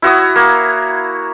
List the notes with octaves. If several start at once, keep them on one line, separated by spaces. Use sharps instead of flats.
E4 F#4 C#5 D#6
A#3